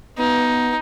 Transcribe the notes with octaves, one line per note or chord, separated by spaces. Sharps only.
B3 D#4